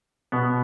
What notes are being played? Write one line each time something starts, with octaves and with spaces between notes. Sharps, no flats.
B2 B3